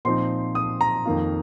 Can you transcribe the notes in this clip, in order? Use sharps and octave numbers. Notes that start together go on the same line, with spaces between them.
A#2 F3 C4 D#4 C6
D#6
A#5
F2 D#3 A#3 F4